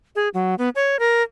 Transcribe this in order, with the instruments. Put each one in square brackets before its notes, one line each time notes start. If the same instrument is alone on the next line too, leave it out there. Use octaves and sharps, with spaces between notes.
[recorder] G#4
F#3
B3
C#5
A#4